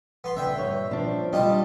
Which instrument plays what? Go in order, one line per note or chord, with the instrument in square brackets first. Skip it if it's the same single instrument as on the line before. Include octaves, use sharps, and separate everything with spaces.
[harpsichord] B3 C6
[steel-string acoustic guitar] D3 [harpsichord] E5 G5
[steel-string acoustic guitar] G2 C#5
F3 D4
[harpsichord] G3 F4 A5 [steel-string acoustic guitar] G4 D#5